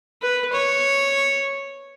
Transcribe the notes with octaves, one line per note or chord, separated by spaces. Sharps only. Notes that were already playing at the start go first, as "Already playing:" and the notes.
B4
C#5